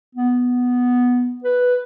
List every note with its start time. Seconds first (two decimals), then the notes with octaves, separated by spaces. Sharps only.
0.15 B3
1.44 B4